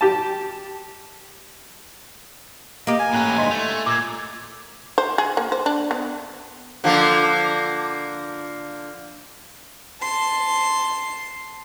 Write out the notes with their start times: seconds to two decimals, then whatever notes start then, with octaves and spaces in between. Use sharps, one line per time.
0.01 G4 A5
2.87 A#3 G4 D#5
2.99 G#5
3.13 A2 C#4 G5 A#5 F#6
3.37 D2 G#2 D#5 C6 B6
3.51 A3 F7
3.86 A#2 D6 E6 G#6
4.98 C5
5.18 G#4
5.37 A#3
5.52 C5
5.66 D4
5.91 B3
6.84 D3 F3 A#3
10.01 A5 C6